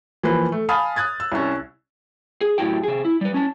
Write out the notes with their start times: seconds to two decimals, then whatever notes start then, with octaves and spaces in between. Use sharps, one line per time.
0.23 E3 F3 A#3 B4
0.52 A3
0.69 F5 G#5 A5 B5 D#6 F6
0.96 D#6 F#6 G#6 A6
1.20 E6
1.32 C2 C#4
2.41 G#4
2.58 F#2 A2 E4 F#4 G4 G5
2.84 C3 G#4
3.05 E4
3.21 G3 B4
3.34 C#4 A5